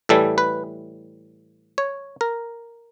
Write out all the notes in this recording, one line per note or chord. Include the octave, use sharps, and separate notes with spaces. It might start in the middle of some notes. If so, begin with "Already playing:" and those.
A2 E3 G3 A4
B4
C#5
A#4